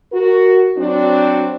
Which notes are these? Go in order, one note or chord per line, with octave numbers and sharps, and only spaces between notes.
F#4 A#4
F#3 C4 D4 F#4